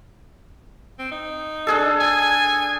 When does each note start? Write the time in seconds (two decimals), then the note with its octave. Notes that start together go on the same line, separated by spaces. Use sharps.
0.99 C4
1.11 D#4
1.67 D4 G#4 A4
2.00 G#5